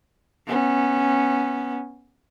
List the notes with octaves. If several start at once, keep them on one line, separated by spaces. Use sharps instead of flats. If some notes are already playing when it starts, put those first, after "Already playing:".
B3 C#4